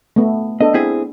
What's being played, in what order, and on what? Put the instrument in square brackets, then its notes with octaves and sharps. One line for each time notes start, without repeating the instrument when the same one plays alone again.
[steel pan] A3 B3
[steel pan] B3 D4 A4 [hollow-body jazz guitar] D#5
[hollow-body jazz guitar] C4 E4 G#4